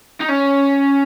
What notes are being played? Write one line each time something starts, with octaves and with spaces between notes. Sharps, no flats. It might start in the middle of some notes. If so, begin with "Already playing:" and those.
D#4
C#4